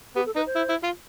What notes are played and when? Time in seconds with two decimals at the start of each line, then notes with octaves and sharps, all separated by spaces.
0.16 B3 G4
0.26 A4
0.36 D#4 B4
0.46 C5
0.56 E4
0.69 E4
0.83 F4